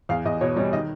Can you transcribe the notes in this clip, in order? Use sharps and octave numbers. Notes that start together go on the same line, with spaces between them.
E2 F5
E2 D#5
B2 C#5
G3 C#5
D#3 D#5